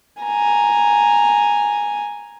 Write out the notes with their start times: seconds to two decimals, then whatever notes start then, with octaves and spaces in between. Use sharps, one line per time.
0.22 G#5 A#5